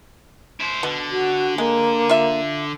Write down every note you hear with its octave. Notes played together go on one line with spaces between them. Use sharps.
E4 C5
B2 D3
F#4
G#3 A#3
F4 E5